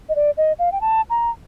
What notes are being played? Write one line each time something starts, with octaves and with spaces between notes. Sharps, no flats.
D#5
D5
D#5
F5
G5
A5
A#5